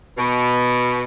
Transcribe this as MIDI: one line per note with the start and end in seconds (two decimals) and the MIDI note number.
0.18 1.04 47